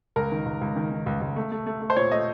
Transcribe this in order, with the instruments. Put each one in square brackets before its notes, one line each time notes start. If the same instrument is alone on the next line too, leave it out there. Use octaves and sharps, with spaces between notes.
[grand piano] C#2 A#4
D#3
C#2
C#2
D#3
D#3
C#2
C#2
A3
A3
A3
A3
C5
A#2 C#5
A3 D#5